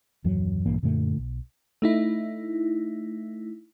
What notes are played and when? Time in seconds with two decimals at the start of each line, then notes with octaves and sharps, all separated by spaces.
0.24 D#1 F#2 E3 F#3
0.66 A#1 G2 E3 A#3
0.83 F#2 A#2 D3 A3
1.18 B1
1.82 A3 D#4 E4